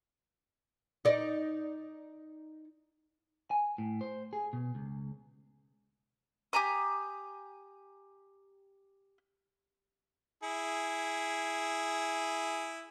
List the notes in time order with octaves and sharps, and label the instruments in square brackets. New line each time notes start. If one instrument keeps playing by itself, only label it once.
[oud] D#4 D5
[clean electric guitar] G#5
A2
C5
G#4
B2
C#2
[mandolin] G4 G#5 A#5 D#6
[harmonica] E4 G#4